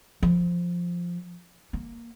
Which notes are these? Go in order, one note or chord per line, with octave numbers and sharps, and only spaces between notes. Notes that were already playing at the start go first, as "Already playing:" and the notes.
F3
A#3